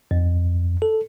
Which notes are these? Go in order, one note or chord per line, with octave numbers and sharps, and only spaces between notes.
F2
A4